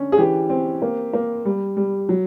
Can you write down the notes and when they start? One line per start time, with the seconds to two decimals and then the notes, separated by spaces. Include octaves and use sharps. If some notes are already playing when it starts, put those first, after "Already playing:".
Already playing: D3 C#4
0.12 G#4
0.18 E3 G4
0.50 C4
0.82 A#3
1.13 A#3
1.45 G3
1.77 G3
2.09 F#3